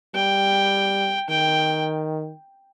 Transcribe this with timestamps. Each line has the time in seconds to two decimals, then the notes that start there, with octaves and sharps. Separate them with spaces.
0.15 G3 G5
1.29 D#3 G5